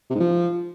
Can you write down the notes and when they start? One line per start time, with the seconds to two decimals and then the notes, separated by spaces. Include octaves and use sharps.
0.10 C3
0.15 G#2
0.20 F3